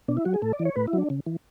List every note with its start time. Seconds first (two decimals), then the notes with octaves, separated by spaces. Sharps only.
0.08 B2 D4
0.17 E4
0.25 F#3 F#4
0.34 G#4
0.42 A2 A4
0.53 D5
0.59 E3
0.65 C#5
0.76 A2 B4
0.87 E4
0.93 F#3
0.98 D4
1.10 C#3
1.26 E3